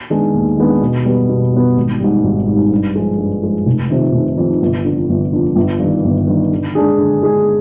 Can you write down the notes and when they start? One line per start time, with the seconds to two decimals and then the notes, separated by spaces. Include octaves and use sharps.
0.10 D#3 G#3 B3 D4
0.34 D#2
0.57 D#3 G#3 B3 D4
0.81 B2
1.05 G3 B3
1.29 B2
1.53 G3 B3
1.77 G#1
2.00 G#2 G3
2.24 G#1
2.47 G#2 G3
2.71 G2
2.95 F3 G#3
3.18 G2
3.42 F3 G#3
3.66 F1
3.90 F2 C3 D#3
4.13 F1
4.37 F2 C3 D#3
4.62 G1
4.85 F2 D3
5.09 G1
5.33 F2 D3
5.56 G1
5.79 G2 D#3
6.04 G1
6.28 G2 D#3
6.51 D3
6.75 G#3 D4 G#4
6.98 D3
7.23 G#3 D4 G#4